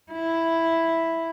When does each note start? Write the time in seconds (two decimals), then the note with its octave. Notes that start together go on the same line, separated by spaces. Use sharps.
0.12 E4